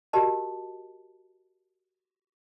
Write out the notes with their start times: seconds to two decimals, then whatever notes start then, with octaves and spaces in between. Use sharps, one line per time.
0.13 F#4 G4 A#4 D#5 A5